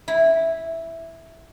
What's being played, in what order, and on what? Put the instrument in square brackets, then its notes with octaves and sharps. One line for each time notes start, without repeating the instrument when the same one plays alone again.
[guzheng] E4